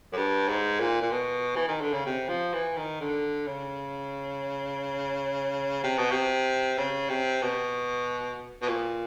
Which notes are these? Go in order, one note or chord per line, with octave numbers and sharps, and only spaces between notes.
F#2
G2
G#2
A#2
A#2
B2
E3
D#3
D3
C#3
C3
F3
E3
D#3
D3
C#3
C3
B2
C3
C#3
C3
B2
B2
A#2